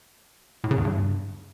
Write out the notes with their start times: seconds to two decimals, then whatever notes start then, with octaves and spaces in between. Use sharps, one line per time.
0.64 A2
0.71 C#3
0.78 E2
0.85 G2